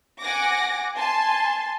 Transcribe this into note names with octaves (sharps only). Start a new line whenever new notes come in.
F#5 G#5 D6 A#6
G#5 A5 C6